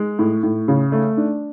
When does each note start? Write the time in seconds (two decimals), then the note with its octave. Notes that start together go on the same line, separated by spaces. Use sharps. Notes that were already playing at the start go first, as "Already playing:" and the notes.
Already playing: G#3
0.19 A2
0.43 A2
0.68 C#3
0.92 A3
1.17 D4